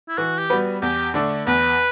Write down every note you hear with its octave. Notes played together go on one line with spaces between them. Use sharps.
E4
E3 F#4
G4
G3 B3 F#4 B4
E2 G4
D3 A3 D4
E2 B4